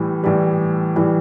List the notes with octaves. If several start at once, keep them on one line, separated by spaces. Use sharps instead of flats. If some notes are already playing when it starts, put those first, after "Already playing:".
Already playing: A2 E3 G3
A2 E3 G3
A2 E3 G3